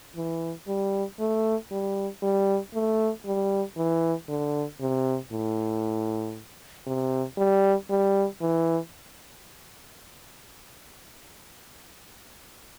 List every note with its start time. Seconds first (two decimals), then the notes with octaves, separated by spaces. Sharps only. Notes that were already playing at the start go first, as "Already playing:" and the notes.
0.16 E3
0.68 G3
1.19 A3
1.71 G3
2.23 G3
2.74 A3
3.26 G3
3.77 E3
4.29 D3
4.81 C3
5.32 A2
6.87 C3
7.38 G3
7.90 G3
8.41 E3